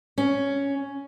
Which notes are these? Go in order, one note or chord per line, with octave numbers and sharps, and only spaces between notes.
C#4